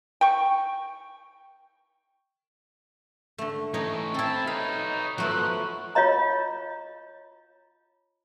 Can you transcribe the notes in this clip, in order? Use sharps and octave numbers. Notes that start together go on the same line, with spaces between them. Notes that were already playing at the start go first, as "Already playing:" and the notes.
G5 C#6
D3 A3
E3 A3 D#4 C#5
C4 E4 A4 A5
D#4 B4 C#5 F5
F3 F#3 A3 B3 F#6
F4 C#5 D#5 A#5